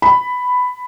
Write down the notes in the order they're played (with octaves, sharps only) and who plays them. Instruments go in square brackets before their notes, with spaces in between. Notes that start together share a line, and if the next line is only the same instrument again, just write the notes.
[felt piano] B5